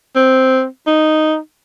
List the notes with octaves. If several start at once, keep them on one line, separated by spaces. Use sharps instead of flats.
C4
D#4